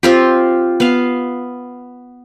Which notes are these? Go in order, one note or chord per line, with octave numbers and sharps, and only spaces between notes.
C4 F4 G4
B3 F5